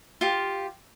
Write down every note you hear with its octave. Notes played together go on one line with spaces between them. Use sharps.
F4 G4